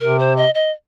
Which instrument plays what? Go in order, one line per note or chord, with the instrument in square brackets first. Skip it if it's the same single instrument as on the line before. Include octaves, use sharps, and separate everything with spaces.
[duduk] C3 [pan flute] A#4
[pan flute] C5
D#5
D#5